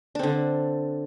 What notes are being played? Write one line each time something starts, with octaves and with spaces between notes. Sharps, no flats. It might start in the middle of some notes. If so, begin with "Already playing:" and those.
D3 C4 D4